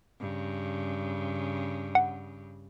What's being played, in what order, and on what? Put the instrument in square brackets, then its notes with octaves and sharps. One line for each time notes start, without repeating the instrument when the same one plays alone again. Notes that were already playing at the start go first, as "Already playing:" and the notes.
[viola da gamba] G2 C#3
[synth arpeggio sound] F#5